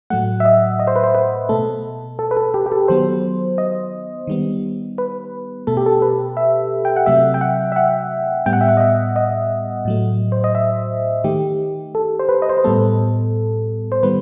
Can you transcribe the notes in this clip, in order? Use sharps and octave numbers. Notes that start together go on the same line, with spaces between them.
A2 F#3 A3 F#5
E5
D#5
D#5
C5
B4
C5
B4
B2 A3 A4
A4
B4
A4
G4
G4
A4
D#3 F#3 B3 C5
D#5
D#3 G3 B3
B4
B2 A3 A4
G4
A4
B4
E5
G5
F#5
C3 F#3 A3 E5
G5
F#5
E5
F#5
A2 G3 B3 G5
F#5
E5
F#5
D#5
E5
D#5
A2 F#3 A3
C5
D#5
E5
D#3 A3 G4
A4
C5
B4
D#5
C5
B4
A2 G3 B3 A4
C5
D#3 G3 B3 B4